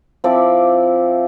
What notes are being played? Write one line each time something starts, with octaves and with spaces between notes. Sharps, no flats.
F3 C4 E4 D5